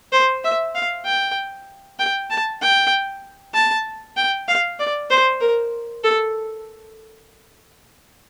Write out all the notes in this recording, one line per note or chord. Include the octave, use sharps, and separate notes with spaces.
C5
E5
F5
G5
G5
A5
G5
A5
G5
F5
D5
C5
A#4
A4